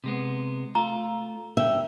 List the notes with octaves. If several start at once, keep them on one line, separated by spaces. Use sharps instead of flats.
C3 G#3 B3
A3 F4 A#5
G2 D3 E5 G5